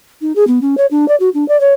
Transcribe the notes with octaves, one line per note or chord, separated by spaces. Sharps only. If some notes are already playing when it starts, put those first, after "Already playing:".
D#4
G#4
B3
C#4
C#5
D4
D5
F#4
D4
D5
C#5